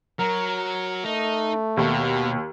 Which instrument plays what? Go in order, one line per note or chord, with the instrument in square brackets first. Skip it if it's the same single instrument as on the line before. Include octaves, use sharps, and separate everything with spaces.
[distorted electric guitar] F#3 [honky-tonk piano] A#4
[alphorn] A3 [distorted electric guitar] D#4
[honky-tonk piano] D#2 [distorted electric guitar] B2